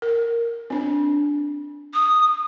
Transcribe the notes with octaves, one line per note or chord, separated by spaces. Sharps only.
A#4
C4 D4
D#6